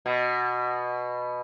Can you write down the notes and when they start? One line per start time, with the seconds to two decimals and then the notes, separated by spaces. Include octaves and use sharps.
0.06 B2